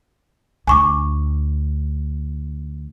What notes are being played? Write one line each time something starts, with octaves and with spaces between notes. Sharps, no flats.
D2 G#5 C#6 D6